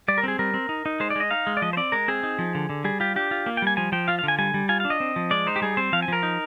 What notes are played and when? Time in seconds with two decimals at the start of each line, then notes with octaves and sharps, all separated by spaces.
0.08 G3 D5
0.18 A#4
0.24 C4 G#4
0.39 G3 A#4
0.54 C4
0.69 D#4
0.86 D#4
1.00 G#3 C5
1.10 D5
1.16 G#3 D#5
1.31 D#4 F5
1.47 G#3
1.57 D5
1.62 F3 D#5
1.73 C5
1.77 C4 D5
1.92 G#3 A#4
2.08 C4 G#4
2.23 D#4
2.39 F3
2.55 D3
2.70 D3
2.84 G3 G#4
3.00 F4 G4
3.16 D4 G4
3.31 F4
3.46 A#3
3.57 G5
3.62 G3 G#5
3.77 F3 G#5
3.92 F3 G5
4.08 F4 F5
4.19 F5
4.23 D3
4.28 G#5
4.38 G3 G#5
4.54 G3
4.69 F4 G#5
4.80 D4 F5
4.90 D#5
5.00 C4
5.16 F3
5.31 G#3 D5
5.47 D#4 C5
5.56 G4
5.62 G3 G#4
5.77 C4 C5
5.93 F3 F5
6.02 G#5
6.08 F3 A#4
6.23 D#4